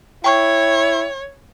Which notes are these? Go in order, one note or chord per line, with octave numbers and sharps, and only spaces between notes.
E4 C#5 G5 C#6